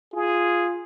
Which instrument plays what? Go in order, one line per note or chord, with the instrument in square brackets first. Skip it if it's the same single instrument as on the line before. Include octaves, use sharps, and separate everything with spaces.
[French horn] F4 [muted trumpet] G#4